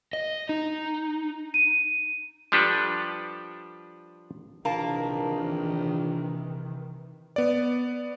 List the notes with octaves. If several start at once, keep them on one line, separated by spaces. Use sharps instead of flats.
D#5
D#4
D#7
F3 G3 D4 G4 A4 B4
A#1 C3 D#3 E3 A#3 A5
B3 D5